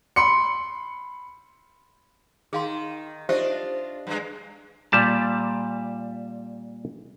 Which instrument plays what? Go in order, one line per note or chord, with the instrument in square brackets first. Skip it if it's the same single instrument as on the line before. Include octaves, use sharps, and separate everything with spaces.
[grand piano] B5 C6 C#7
[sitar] D#3 [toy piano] G#4 F5 C6
[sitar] D4 F4 D#5 [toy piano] G4 C5 E5
[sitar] G2 G#3
[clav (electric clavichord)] A#2 G3 A5